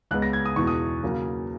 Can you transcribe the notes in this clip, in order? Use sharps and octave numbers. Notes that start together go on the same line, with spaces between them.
C#2 C#3 G#3 B3 F#6
A#6
G#6
D#6
E2 B2 G#3 C#6
D#6
C#3 F#3 A#3 C#4